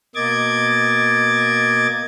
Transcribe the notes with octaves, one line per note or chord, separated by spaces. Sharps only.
B2 A#3 D#5 D6 G#6 A6